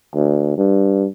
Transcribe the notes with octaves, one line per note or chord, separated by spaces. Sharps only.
D2
G2